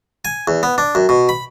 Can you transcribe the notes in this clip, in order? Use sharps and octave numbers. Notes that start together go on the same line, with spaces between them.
G#5
E2
B3
D4
F#2
B2
B5